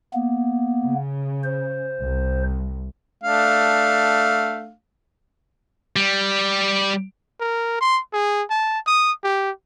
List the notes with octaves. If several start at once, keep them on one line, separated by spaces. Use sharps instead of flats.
A#3 B3
C#3
C5
C2
A3 D4 F5
G3
A#4
C6
G#4
A5
D#6
G4